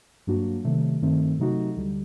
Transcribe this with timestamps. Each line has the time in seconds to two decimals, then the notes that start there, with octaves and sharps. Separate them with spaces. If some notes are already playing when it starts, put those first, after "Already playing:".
0.27 G2 F#3 A#3 D4 F#4
0.64 C3 D#3 F#3 A3
1.02 G2 D#3 A3 C4
1.39 C3 F#3 A3 D#4 F#4
1.77 D2 D3 G3